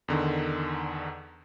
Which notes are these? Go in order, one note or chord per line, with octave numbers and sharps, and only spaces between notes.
E2 D3 D#3